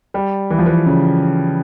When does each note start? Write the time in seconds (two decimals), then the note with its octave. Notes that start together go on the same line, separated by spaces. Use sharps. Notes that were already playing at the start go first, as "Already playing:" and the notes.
0.14 G3
0.50 E3
0.59 F3
0.66 E3
0.86 C#3